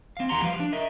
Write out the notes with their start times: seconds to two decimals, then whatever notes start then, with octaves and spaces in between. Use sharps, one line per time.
0.17 C4 F5
0.29 D#2 D#3 G4 F#5 A#5 C6
0.42 F3 G3 B4 F5
0.60 D4
0.73 A#4 D#5 E5